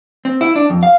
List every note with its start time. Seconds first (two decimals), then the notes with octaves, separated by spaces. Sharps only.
0.25 C4
0.41 E4
0.56 D4
0.70 F2
0.83 F5